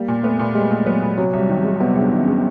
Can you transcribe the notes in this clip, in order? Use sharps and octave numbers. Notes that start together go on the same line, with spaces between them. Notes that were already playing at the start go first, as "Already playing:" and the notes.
Already playing: G3 A#3
A#2
A3 B3
A#2
G3 G#3
A#2
F#3 B3
A#2
C3 F#3
C2
G3
D#3
G#3
C3 B3
C2
D4
D#3
C#4
G#3